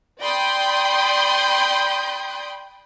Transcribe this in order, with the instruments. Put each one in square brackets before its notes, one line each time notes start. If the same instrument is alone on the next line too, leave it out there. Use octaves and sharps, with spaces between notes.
[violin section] D5 G5 B5 C6 D#6 G6